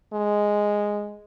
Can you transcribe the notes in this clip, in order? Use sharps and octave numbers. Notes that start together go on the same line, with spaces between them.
G#3